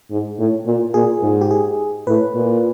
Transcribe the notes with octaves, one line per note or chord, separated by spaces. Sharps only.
G#2
A2
A#2
A#2 G#4
G#2
G4
G#4
A2 B4
A#2